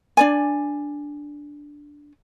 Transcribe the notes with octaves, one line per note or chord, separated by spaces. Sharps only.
D4 D5 G#5